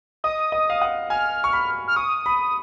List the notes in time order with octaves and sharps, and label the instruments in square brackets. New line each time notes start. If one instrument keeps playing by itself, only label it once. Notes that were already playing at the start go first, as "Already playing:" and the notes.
[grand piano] D#5 [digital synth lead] D#6
[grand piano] D#5
F5
F#5
[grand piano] G#5 [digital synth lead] F6
[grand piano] C#6
B5
[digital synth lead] F6
[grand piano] C#6 [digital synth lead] D#6
[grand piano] B5